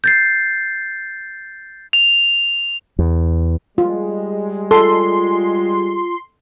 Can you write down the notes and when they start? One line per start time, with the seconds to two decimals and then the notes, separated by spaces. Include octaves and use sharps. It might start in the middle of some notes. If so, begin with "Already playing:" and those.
0.04 G6 A6 C7
1.93 F7
2.99 E2
3.78 G3 G#3 F4
4.71 F4 A4 C6